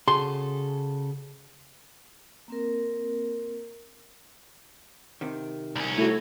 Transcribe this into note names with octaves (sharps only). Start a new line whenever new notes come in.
C#3 F#4 G#4 A4 C6
A#3 C4 A#4
C3 D#3
C2 C#4
A3 E4 F#4